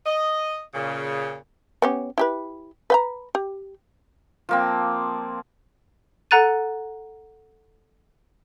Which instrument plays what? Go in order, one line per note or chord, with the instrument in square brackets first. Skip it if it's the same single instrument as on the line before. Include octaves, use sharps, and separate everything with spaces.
[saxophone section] D#5
A#2 C#3
[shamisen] B3 C#4 G4
E4 G4 B4
B4 G5 A#5
G4
[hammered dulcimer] F3 A#3 C4
[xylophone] A4 F#5 A#5 F#6 A6 D#7